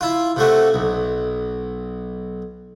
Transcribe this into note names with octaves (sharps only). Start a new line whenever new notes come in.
E4 F4
C3 A3 F#4
B1